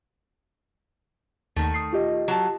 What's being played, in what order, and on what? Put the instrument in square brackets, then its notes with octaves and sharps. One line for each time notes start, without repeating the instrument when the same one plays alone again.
[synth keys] D#2 [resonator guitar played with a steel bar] D#3 A3
[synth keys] D#6 C7
F4 G4 D#5
[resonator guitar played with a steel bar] F#3 A5